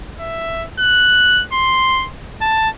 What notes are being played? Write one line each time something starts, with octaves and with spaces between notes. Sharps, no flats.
E5
F#6
C6
A5